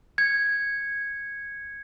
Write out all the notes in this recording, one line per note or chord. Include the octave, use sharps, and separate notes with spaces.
G#6 C#7